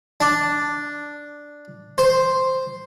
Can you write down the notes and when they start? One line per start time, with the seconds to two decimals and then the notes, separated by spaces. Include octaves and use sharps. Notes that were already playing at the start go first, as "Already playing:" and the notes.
0.21 D4
1.98 C5